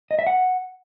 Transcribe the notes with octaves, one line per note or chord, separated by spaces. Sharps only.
D#5
E5
F#5